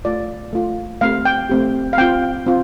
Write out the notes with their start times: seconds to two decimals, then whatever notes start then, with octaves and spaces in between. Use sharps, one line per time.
0.05 A3 F4 D5
0.53 A3 F4
1.01 A3 C4 G4 F5
1.25 G5
1.49 A3 C4 G4
1.93 F5
1.98 C4 F4 G5
2.46 C4 F4